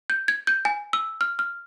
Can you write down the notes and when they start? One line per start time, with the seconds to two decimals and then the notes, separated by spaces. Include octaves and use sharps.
0.10 G6
0.28 G#6
0.47 G6
0.65 G#5
0.93 E6
1.21 F6
1.39 F6